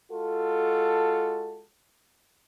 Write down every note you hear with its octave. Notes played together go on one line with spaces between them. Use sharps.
G#3 F4 F#4 A4